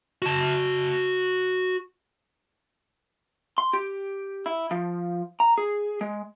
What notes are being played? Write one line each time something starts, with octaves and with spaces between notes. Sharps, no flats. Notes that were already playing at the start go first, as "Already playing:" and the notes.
F#4 A5
C6
G4
E4
F3
A#5
G#4
G#3